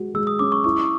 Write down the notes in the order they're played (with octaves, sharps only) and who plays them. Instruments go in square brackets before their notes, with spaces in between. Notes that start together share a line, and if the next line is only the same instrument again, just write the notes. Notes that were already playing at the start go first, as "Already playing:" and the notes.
Already playing: [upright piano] G#3 F#4
[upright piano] G#3 [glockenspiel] E6
[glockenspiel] D#6
[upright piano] C#4 [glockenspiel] D6
[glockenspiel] C#6
[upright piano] E4 [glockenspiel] C#6